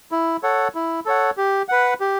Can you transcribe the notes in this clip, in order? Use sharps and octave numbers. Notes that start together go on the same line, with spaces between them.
E4
A4 C#5 F#5
E4
A4 C#5 F#5
G4
B4 F#5
G4